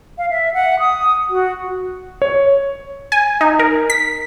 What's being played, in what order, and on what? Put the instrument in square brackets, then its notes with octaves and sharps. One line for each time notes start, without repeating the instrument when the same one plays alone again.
[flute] F5
E5
F#5
D#6
F#4
[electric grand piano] C#5
[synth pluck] G#5
D#4
A#4
B6